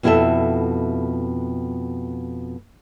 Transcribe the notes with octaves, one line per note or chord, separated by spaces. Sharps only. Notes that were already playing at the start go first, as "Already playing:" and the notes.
F2 B2 E4 G4 A4 E5